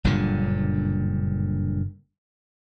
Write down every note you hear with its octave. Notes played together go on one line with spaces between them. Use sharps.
F#1 G2 A#2 D3